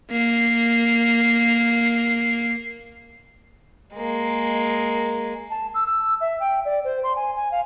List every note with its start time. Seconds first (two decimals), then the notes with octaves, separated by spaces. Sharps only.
0.11 A#3 C7
3.95 G#3 A#3
5.51 A5
5.75 E6
5.86 E6
6.21 E5
6.40 G5
6.65 D5
6.85 C5
7.04 C6
7.16 G#5
7.36 G#5
7.51 F5